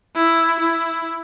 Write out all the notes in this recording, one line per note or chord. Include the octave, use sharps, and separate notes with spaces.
E4
E4